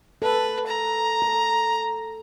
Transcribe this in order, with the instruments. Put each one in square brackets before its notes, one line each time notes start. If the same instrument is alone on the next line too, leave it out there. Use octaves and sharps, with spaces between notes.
[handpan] A4 [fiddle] B4
[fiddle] A#5
[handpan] A4